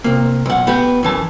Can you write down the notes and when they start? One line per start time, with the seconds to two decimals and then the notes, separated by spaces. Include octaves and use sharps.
0.04 C3 A#3
0.46 B1 F#5
0.67 B3 G4 F#5
1.03 F#2 E3 A5